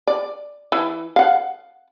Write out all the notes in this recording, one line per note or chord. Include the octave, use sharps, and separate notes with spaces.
D5
E3
F5 F#5